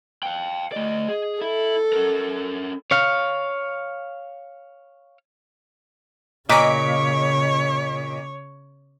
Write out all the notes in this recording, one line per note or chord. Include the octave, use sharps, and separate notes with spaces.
F5 G5
A3 D5 D#5
G#4
E4 A4 E5
C#4 A#4
C#5 F5
A#2 C#3 C#5 D#5 B6 D7